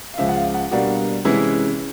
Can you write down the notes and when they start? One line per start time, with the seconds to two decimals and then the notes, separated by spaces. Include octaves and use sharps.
0.14 F5
0.18 C#2 C#3 F3 G#3 E5
0.29 F#5
0.36 F5
0.54 F#5
0.71 B2 G3 A#3 D4 F#5
1.25 C3 E3 G#3 C#4 E4